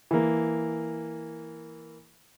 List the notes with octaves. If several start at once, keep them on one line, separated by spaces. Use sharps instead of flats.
E3 A#3